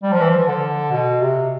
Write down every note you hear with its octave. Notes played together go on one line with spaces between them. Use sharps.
G3
F3
E3
F3
D3
B2
C3